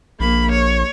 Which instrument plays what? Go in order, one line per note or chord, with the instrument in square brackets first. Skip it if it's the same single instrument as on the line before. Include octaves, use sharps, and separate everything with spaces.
[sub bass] A#1 [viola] A#3 B5
[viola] C#5